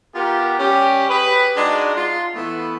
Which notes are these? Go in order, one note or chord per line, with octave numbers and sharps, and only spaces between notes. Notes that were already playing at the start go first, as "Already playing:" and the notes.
B3 F4 G4 A#4
G3 C#4 G4
G4 G#4 B4
G#3 D4 D#4 F#4 D#5
F4 C6
E3 A3 B3